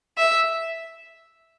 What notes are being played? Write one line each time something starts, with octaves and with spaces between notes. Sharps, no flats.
E5